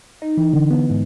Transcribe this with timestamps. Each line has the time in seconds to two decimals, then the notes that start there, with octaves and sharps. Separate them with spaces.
0.22 D#4
0.37 E3
0.53 D3
0.71 B3
0.90 G#2